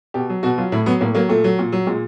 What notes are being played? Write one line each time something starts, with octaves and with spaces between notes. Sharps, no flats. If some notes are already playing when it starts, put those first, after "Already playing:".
B2 G4
F#3
B2 F#4
F#3 F4
A2 E4
F#3 B3
A2 A#3
F#3 A#3
A#2 A3
F#3
A#2
F#3
A#2 G#3